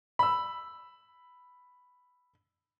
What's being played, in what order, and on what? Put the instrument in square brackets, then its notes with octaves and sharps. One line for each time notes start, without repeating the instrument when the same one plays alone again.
[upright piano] B5 E6